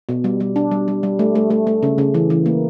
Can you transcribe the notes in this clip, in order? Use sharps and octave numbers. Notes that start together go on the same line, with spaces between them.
B2
G3
G3
D4
G3
G3
G3
A3
A3
A3
A3
C#3
C#3
E3
E3
A#3